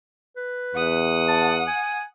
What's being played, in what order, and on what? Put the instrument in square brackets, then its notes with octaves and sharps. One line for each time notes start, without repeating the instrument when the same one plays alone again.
[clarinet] B4
[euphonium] E2 [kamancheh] F#5 D#6
[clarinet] A5
G#5